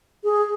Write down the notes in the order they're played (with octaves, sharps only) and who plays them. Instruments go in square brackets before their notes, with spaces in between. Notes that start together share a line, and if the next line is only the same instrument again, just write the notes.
[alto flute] G#4